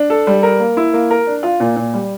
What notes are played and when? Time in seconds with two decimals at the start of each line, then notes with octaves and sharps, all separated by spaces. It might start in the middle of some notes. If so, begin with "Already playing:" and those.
Already playing: D4
0.10 A4
0.27 G3
0.43 A#4
0.60 A#3
0.77 E4
0.93 A#3
1.11 A#4
1.27 D4
1.43 F4
1.60 A#2
1.76 A#2
1.94 G3